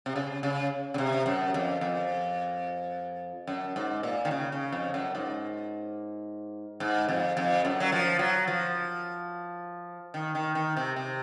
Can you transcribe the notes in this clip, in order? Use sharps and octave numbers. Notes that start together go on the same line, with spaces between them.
C3
C#3
C#3
C#3
C3
F#2
F2
F2
F#2
G#2
A#2
D#3
C#3
C#3
F2
F#2
G#2
G#2
F2
F2
F#2
F#3
F3
F#3
F3
D#3
D#3
D#3
C3
C3